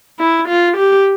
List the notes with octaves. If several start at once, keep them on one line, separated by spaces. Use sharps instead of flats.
E4
F4
G4